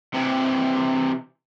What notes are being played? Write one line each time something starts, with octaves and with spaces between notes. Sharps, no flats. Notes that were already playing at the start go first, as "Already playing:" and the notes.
C3 E3